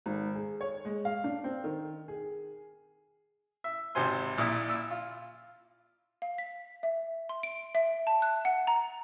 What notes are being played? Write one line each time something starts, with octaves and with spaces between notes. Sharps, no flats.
G#1
G#4
C#5
G#3
F5
D4
C4
D#3
G#4
E5
G#1 C3 C5 G#5 C6
A#1 A#2 E4 D5 D#6
E6
F4
F5
B6
E5
C6
D7
E5
A5
F#6
F#5
A#5